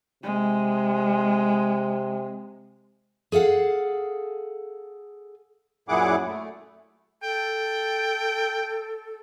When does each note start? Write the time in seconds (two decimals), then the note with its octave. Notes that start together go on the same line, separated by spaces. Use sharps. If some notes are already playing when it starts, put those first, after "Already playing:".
0.23 C3 G#3
3.32 G#4 A4 F5 F#5
5.89 F#2 A#2 E4 G#4 F#5 D6
6.26 A3
7.23 A4 G5